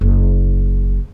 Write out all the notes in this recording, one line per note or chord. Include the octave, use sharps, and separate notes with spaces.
F#1